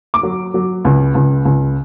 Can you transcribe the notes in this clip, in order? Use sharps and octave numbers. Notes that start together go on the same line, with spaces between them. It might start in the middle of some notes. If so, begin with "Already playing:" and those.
D6
F#3
F#3
C#2
C#2
C#2